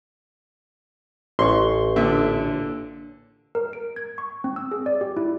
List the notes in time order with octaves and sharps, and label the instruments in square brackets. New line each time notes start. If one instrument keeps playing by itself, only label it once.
[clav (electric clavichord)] A1 [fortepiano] C6 C#6
[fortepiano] A#2 D3 E5
[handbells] A#4
D7
G#6
C#6
C4
E6
G#4
D5
G4
E4